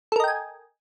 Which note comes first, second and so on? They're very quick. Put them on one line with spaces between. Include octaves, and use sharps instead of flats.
A4 A#4 D#5 G5 G#5